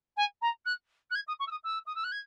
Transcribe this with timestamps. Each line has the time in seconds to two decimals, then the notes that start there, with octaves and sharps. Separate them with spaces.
0.16 G#5
0.41 A#5
0.65 F#6
1.10 F#6
1.15 G#6
1.27 D#6
1.39 C#6
1.47 E6
1.51 D#6
1.64 E6
1.86 D#6
1.95 E6
2.04 F#6
2.11 G#6